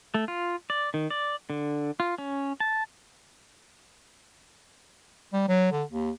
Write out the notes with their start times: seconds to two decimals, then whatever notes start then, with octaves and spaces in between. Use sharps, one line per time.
0.14 A3
0.28 F4
0.70 D5
0.94 D#3
1.10 D5
1.50 D3
2.00 F4
2.18 C#4
2.60 A5
5.33 G3
5.48 F#3
5.72 D3
5.90 D#2